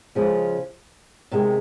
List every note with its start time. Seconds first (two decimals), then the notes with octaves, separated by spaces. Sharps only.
0.15 C#3 F3 G#3 C#4
1.32 C3 D#3 G#3